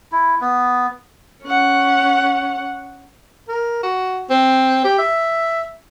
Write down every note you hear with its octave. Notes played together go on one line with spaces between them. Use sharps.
E4
B3
C#4 F#5
A#4
F#4
C4
G4
E5